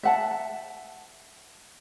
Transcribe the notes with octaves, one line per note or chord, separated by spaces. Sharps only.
E5 F#5 A5